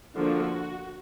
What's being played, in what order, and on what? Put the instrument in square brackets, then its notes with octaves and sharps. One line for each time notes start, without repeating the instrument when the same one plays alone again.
[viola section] D3 F3 A#3 D4 F#4